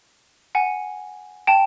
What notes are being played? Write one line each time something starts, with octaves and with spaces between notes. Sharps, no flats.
F#5 G#5
G5 A5